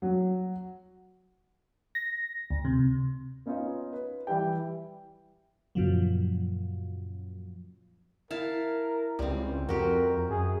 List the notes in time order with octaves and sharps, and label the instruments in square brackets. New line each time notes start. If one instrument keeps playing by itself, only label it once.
[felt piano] F#3
[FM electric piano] A#6
D2
C3
[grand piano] B3 C#4 D#4 F4 D#5
B4
E3 G3 E4 G4 G5
[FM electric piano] F#2 A#2 C#3 F3 F#3
[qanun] E4 F5 A5 [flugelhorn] A#4
[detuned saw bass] C#2 [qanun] G3 C4
[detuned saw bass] F2 [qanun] F#4 G4 [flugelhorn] A#4
[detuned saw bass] F#2 [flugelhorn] G#4